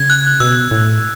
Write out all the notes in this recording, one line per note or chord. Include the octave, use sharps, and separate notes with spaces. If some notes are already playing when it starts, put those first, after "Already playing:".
Already playing: C#3 G#6
F#6
B2 E6
A2